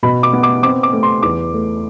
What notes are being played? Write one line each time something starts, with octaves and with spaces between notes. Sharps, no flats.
B2 B5
D6
B3
D6
C4 D6
D6
A3
C6
E2 D6
A3